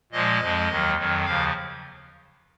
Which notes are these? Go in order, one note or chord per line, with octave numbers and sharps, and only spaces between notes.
A#2 F3 G#3 D#5
F2 F3 G#3
D#2 D#3 F#3
F2 D#3 F#3
D#2 C#3 F3 F5